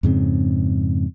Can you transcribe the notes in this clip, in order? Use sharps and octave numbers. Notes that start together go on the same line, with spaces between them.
F2 G#2 C#3 C4